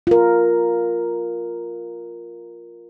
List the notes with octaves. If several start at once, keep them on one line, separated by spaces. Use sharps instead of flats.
F4 A#4